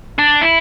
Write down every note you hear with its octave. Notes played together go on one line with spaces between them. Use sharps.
D4
E4